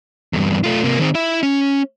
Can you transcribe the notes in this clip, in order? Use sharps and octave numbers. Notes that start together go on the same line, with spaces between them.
E2 G2
A3 F4
C3 A#3
D#3 C4
E4 E5
C#4